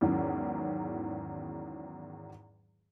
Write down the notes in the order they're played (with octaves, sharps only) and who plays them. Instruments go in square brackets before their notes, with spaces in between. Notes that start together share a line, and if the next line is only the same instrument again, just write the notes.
[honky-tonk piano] E2 G#2 D#3 E3 F#3 C#4